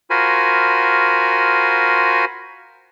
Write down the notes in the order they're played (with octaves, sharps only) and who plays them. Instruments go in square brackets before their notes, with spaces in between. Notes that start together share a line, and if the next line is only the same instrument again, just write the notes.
[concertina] F4 F#4 A#4 C5 G#5 B5